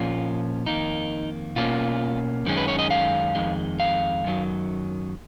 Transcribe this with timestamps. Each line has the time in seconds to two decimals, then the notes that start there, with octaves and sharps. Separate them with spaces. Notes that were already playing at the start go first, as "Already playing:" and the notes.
Already playing: A#2 F3 A#3 C#4 F4
0.66 F2 D#3 A#3 D#4
1.56 B2 A#3 C#4 F4
2.46 F#2 D#3 G#3 C#4
2.57 B4
2.68 C#5
2.79 D#5
2.90 F5
3.35 F2 D#3 G#3
3.80 F5
4.24 F#2 D#3 F#3